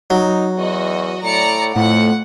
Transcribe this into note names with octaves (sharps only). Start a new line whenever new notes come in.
F#3 D#4
E2 F#4 D#5
A2 D5 A#5 C#7
F2 A2 F#5